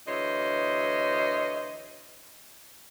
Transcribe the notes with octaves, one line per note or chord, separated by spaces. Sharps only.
D2 E3 C5 C#5 D#5